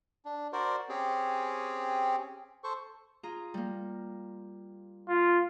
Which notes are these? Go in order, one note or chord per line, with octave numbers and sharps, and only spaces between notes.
D4
F#4 A#4 C5 D5
C4 C#4 G4 G#4
A4 C5 C#6
F4 G#4 A#5
G3 A#3
F4